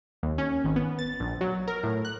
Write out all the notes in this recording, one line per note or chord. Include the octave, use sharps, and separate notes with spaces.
D#2
C#4
G#1
B3
A6
A#1
F#3
A#4
A2
F#6